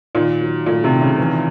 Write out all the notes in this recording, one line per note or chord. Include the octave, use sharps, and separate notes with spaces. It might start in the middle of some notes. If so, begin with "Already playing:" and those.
A#2 D#3
F#3
A#2 A3
C3
D#3
C#3
E3